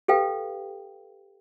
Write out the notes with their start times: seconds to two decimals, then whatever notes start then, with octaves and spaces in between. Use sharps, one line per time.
0.08 G4 A4 B4 F5 G5